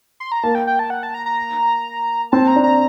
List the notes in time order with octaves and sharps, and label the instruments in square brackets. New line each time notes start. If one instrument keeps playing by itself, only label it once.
[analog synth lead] C6
A#5
[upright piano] A#3 [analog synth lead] A5
[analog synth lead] G5
G5
A5
F#5
A5
A#5
A#5
[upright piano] C4 [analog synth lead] A5
[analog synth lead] A#5
[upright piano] D4
[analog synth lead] A#5